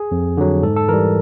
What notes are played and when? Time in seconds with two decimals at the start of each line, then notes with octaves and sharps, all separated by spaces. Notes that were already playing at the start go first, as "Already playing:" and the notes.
Already playing: G#4
0.11 F2
0.37 D3 F#3
0.63 G#2 A4
0.76 A4
0.89 E3 G3 A#4